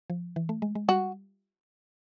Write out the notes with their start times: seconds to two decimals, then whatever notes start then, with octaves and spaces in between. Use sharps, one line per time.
0.10 F3
0.36 E3
0.49 A3
0.62 G#3
0.75 G#3
0.88 G3 F#4